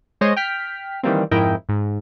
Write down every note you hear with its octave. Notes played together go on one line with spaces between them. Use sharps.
G#3 C5 C#5 D#5
G5 F6 B6
D#3 E3 G3 A#3 C4
F2 G#2 E4 A#4 D#5 G5
G#2